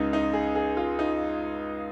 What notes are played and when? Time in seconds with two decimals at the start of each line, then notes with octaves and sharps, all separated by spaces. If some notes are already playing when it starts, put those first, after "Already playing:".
Already playing: C#2 C#3 D#4
0.13 D#4
0.33 G#4
0.55 G#4
0.77 F4
0.99 D#4